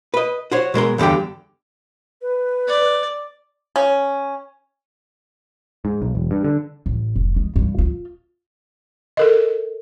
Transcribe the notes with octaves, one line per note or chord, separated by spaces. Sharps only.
B4 D#5
F#4 C5 C#5
B2 G#3 A#4 C6
E2 G2 D3 G4 G5
B4
D5
C#4
G#2
B1
E1
G2
D3
A1
F1
G#3
G2
F4
A4 A#4 D#5